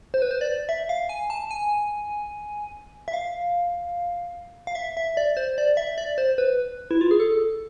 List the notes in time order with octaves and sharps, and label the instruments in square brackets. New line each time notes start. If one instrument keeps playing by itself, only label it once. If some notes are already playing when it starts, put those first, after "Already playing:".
[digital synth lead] C5
B4
C5
D5
E5
F5
G#5
A5
G#5
E5
F5
F5
E5
E5
D5
C5
D5
E5
D5
C5
B4
E4
F4
G#4
A4